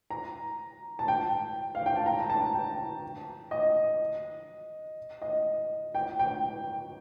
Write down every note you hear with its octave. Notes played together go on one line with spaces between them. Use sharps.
A#5
A5
G5
F5
G5
A5
A#5
A#5
A5
G5
D#5
D#5
G5
G5